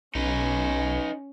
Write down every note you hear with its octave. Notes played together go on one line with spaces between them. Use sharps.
B1 C#4 D#4 B4